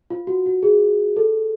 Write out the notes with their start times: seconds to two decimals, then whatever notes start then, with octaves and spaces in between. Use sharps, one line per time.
0.10 F4
0.27 F#4
0.46 F#4
0.63 G#4
1.17 A4